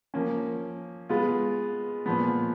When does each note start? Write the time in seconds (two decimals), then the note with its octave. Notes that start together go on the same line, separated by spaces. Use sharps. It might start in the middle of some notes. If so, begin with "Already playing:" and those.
0.14 F3 A#3 C#4
1.09 G#3 B3 F4
2.06 A#2 F3 B3